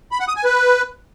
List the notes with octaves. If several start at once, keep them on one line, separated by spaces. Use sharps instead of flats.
B5
F#5
D#6
G#5
B4